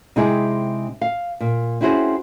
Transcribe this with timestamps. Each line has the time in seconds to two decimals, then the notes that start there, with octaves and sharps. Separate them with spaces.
0.16 C3 G#3 C4 D#4 E4 G#4
1.01 F5
1.40 A#2
1.81 C4 C#4 E4 F#4 G#4 C5